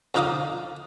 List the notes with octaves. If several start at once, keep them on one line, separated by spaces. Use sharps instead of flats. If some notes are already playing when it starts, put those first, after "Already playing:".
F2 D3 D#4 F5 D6 D#6